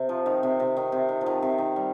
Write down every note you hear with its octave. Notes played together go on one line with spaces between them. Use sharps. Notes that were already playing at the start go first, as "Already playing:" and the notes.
Already playing: C3
F3
D#3
C3
C3
D#3
C3
D#3
F3
D#3
C3
D#3
G3